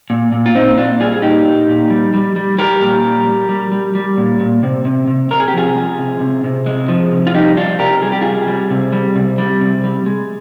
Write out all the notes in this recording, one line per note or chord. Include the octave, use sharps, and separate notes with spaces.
A#2
A#2
F4
A#2 C4 D#4
A#2 D4 F4
G3 F4 G#4
G#4
A#2 D#4 G4
A#2
A#2
G3
G3
G3
G3 G4 A#4
A#2
G3
G3
G3
G3
G3
A#2
A#2
C3
C3
C3
C3 A#4
G#4
G4
F3 F4 G#4
G#3
C3
C3
C3
G#3
F3
C3
F4
G3 D#4 G4
C3 D4 F4
C3 G4 A#4
G3 G#4
G4
C3 F4 G#4
G3
C3
G3
C3
G3
C3
G3
G#3